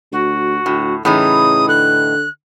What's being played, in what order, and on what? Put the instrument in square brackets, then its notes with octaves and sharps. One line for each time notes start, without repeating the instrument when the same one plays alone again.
[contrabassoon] D2 [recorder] F#4
[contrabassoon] D2 [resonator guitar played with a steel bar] A2
[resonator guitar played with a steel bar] A2 E3 D#4 [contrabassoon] C#3 [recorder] D#6
[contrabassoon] D3 [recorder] F#6